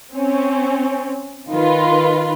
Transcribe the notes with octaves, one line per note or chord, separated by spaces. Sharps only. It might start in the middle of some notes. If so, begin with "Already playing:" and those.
C4 C#4
D#3 F4 B4